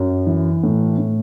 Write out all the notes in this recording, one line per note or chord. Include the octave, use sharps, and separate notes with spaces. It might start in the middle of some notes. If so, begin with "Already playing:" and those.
Already playing: F#2
E3
A2
A2